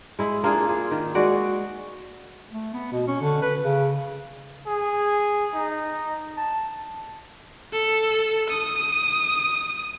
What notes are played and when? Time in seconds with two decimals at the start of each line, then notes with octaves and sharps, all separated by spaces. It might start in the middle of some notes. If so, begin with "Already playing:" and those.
0.19 G#3 E4
0.43 A#3 D4 F4 G#4
0.69 F4 G#4
0.91 D#3
1.15 G#3 F#4 D5
2.51 A3
2.74 B3
2.92 B2
3.08 C#4
3.21 D3
3.42 B4
3.62 C#3
4.67 G#4
5.54 D#4
6.37 A5
7.73 A4
8.50 D#6